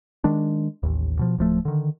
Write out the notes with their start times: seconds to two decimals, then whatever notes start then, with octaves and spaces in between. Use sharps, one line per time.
0.24 D#3 G#3 D4
0.83 A1 D#2
1.19 B2 F3
1.38 D1 F3 A3
1.65 D3 D#3